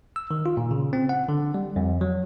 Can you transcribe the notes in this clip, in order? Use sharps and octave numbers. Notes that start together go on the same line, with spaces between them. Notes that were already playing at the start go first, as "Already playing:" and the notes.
E6
D#3
F4
A#2
C#3
C4
F#5
D3
G3
F2
F#3